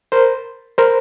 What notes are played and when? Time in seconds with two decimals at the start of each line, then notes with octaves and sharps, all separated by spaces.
0.12 A#4 C5
0.78 A#4 C5